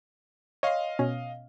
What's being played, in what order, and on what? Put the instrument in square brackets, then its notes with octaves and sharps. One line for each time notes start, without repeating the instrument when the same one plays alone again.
[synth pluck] C#5 C6 [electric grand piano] D#5 F5
[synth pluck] B2 C#4